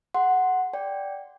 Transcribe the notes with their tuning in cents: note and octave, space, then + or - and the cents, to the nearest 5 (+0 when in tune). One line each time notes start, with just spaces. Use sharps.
G#4 +0 F#5 +0 C6 +0
D5 -10 G5 +0